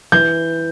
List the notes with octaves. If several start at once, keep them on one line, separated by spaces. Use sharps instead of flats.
E3 G6